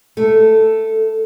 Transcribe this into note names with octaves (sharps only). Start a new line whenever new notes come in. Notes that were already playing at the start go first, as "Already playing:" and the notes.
A3 A4